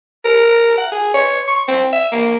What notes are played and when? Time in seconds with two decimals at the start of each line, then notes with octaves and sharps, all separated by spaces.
0.25 A#4
0.78 F#5
0.92 G#4
1.14 C#5
1.48 C#6
1.68 C4
1.93 E5
2.12 A#3